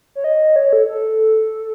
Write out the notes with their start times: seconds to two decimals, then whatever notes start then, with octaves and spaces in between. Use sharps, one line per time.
0.15 C#5
0.24 D#5
0.56 C#5
0.73 A4
0.88 A4